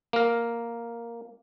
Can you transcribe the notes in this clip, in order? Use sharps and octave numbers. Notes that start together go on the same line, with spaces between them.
A#3 A#4